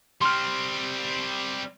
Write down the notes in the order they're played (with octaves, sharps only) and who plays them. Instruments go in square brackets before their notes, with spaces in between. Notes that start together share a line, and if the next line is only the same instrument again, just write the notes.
[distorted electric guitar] G3 C4 [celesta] C6 F6